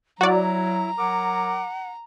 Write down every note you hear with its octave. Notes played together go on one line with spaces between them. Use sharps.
F#3 E4 F#4 D5 A#5
F#3 A#4 F#5 D6